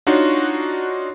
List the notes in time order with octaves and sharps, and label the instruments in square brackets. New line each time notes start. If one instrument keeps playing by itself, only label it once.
[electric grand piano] D4 D#4 F4 F#4 C#5